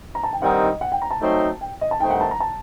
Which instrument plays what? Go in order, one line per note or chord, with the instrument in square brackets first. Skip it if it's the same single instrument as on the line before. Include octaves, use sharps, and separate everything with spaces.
[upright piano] A#5
A5
G5
[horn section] G2 D#3 G3 C4 D#4 [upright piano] F#5
[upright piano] D#5
F#5
G5
A#5
A5
[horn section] F#3 A3 C4 D#4
[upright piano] G5
D#5
A5
[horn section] G2 D#3 A3 C4 D#4 [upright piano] G5
[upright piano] F#5
A5
A#5
A5